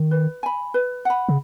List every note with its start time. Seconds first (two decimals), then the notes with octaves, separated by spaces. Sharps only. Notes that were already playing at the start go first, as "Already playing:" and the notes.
Already playing: D#3
0.11 B4
0.43 G#5 B5
0.74 B4
1.05 F#5 B5
1.29 C#3